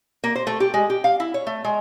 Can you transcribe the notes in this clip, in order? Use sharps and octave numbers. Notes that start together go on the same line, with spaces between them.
A#3
C5
A3
G4
G#3
G4
F5
E4
C#5
A3
G#3